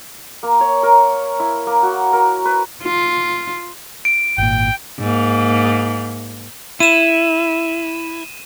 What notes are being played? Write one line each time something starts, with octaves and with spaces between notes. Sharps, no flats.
A#3
C#5
A#4
E4
A#3
F#4
A#4
B4
F4
D7
G#1 A#2 G5
G#2 A#3
E4 D#7 E7